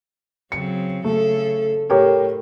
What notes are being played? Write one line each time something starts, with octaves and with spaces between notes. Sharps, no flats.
C#3 F#3 C4 C#7
C#3 A3 A4
A2 A3 G4 A#4 C#5